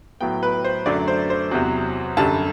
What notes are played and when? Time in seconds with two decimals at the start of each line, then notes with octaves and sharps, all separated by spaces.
0.21 A2 F#3 B3 G5
0.43 B4
0.64 C5
0.86 F#2 D3 F#3 A3 D5
1.08 C5
1.30 C5
1.51 E2 C3 F#3
2.17 F#2 D3 G3 A5